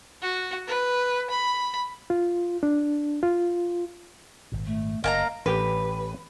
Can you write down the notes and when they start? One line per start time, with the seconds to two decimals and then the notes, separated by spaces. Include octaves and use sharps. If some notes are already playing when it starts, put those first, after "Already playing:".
0.22 F#4
0.67 B4
1.30 B5
2.10 F4
2.63 D4
3.23 F4
4.52 G#1 A#2
4.66 A3
5.04 F#1 A#3 D#5 A5 A#5
5.46 A1 G4 B4 G5